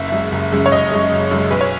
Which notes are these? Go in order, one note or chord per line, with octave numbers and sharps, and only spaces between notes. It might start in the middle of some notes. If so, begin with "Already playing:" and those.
Already playing: F#1 E5
F#2 C#3 G#3
F#1
F#2 C#3 G#3
C#5
F#1 D#5
F#2 C#3 G#3
F#1
F#2 C#3 G#3
B1 B4
C#5